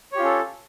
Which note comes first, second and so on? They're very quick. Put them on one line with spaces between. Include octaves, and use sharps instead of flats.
C#5 G4 F4 C#4 A4